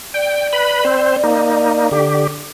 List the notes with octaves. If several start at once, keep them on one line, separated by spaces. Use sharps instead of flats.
D5 G5
B4 B5
C4 C5
A#3 D#4
D3 G4